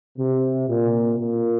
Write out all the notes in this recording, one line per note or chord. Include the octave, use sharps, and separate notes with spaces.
C3
A#2
A#2